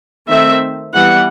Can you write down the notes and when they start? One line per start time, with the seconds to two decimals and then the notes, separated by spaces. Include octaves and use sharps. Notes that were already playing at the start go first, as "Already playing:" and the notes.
0.28 D#3 A3 C4 E5
0.94 E3 G3 B3 F#5